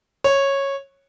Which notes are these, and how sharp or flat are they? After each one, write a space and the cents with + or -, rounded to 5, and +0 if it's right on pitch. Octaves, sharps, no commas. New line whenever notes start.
C#5 -10